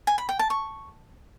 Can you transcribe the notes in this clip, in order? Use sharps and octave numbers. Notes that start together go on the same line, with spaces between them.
G#5
B5
G5
A5
C#6